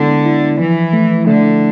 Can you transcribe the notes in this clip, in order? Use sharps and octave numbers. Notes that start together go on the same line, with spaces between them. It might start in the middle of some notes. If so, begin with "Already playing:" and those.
Already playing: D3 G#3 B3 E4
E4
E3 F3
A3
D3 A3